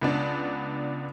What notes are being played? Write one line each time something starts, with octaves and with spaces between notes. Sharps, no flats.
C#2 B3 D4 D5